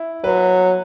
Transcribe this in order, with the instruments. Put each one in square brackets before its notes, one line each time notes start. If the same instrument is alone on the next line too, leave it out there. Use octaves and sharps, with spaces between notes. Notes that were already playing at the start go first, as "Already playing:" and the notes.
Already playing: [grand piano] E4
[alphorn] F#3 [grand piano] B4